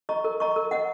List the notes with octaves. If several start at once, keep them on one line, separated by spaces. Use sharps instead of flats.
D#5 A#5 C#6
A#4
D#5 A#5 C#6
A#4
D#5 F#5